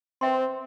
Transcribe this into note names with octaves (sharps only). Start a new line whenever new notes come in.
C4 B4 E5 G5 C6